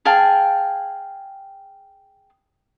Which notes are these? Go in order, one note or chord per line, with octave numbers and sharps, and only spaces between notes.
G#4 F5 G5 A5